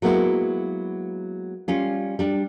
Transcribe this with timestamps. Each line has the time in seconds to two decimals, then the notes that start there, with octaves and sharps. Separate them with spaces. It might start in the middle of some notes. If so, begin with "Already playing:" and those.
0.02 F#3 G#3 A#3 B3 E4
1.68 G3 C#4 F4
2.19 G3 D4